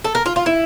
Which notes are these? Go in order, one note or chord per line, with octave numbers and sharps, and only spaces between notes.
A4
A#4
F4
F4
E4